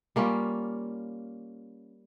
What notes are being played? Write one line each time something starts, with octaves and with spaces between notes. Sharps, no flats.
G3 A#3 C#4 F4